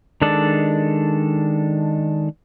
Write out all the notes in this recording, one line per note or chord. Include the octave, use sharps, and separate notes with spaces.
D#3 G#3 D4 A4 D5